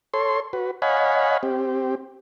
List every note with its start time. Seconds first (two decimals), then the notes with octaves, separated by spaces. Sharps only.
0.14 A4 C#5 C6
0.53 F#4 B4
0.82 C#5 D#5 F5 F#5 G#5 B5
1.43 C4 G4